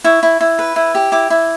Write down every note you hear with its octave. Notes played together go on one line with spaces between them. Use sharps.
E4 C#6
E4
E4
B4
E4
G4
E4 D6
E4